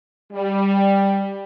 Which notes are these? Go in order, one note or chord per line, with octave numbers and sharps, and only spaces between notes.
G3